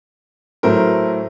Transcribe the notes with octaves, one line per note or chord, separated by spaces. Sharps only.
A2 F#3 A3 A#4 C5